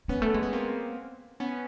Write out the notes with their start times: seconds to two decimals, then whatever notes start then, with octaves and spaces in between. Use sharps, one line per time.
0.08 G#3 B3 C#4
0.22 A3
0.34 G#3
0.43 B3
0.53 A#3 C4
1.40 B3 C#4